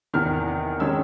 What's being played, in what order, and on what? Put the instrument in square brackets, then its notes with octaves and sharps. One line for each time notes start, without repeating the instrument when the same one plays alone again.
[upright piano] E2 C3 D#3 F6
D#3 G#3 C#4 E6